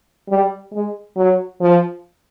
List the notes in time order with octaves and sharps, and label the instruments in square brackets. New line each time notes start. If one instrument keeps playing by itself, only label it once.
[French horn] G3
G#3
F#3
F3